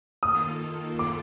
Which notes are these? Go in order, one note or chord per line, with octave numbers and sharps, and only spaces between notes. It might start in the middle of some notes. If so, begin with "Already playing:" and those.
D#3 A#3 F4 A4 D#6
D6